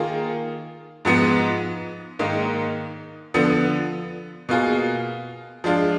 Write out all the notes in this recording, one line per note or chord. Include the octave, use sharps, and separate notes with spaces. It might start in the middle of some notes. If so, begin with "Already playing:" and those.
Already playing: D#3 A#3 F4 G#4
G#2 F3 B3
G#2 D#3 A#3 D#4
D3 F3 B3
B2 A#3 F4 G#4
F3 G#3 D4 F4